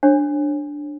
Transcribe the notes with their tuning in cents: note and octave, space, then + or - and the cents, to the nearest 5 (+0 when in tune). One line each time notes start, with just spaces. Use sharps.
D4 +0 C#5 -40